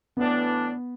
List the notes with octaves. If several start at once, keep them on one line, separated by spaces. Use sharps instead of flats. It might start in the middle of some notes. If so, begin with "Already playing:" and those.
A2 E3 B3 D4